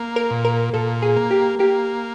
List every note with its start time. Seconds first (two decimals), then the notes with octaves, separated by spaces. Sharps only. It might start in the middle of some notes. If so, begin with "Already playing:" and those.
Already playing: A#3
0.16 A#4
0.30 A#2
0.45 A#4
0.73 A#2 A4
1.02 G#4
1.16 A#3
1.31 G4
1.59 A#3 G4